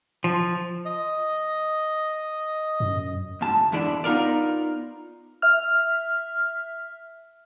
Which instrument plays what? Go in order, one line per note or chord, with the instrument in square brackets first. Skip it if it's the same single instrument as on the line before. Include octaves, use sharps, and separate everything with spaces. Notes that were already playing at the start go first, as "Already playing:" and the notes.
[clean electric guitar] F3
[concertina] D#5
[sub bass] F#2
[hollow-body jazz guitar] D2 G#2 A5
E2 G#2 D3 E4 D5
B3 D#4 F4 A#4 D5
[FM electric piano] E5 F6